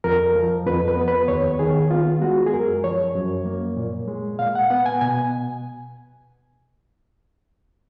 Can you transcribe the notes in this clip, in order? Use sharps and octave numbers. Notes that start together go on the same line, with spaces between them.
F2 A#4
F3
F2 B4
B4
B3
B4
D#2 C#5
D#3 G#4
B3 F4
G#3 F#4
G#4
F#2 A#4
F3 C#5
F#2
A#3
A#2
G#3
A#2 F5
F#5
B3 F#5
G#5
B2 G#5